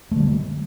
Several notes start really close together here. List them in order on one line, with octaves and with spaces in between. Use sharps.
A3 D3 G3 A#3